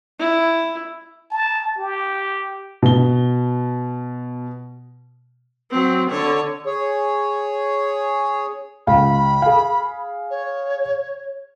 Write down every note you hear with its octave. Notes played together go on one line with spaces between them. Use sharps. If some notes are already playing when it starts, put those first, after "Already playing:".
E4
A5
G4
B2 G7
F#3 C4
D3 C#5
G#4 C#5
C#2 F5 B5
G#4 F5
C#5